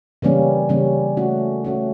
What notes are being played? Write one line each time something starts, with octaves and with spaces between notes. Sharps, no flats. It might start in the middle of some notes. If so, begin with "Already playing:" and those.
C#3 E3 G3 A#3 C#4
C#3 E3 G3 A#3 C#4
A3 C#4 F#4
A3 C#4 F#4